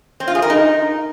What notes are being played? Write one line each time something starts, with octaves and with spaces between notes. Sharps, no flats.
C4
F4
G#4
A#4
D#4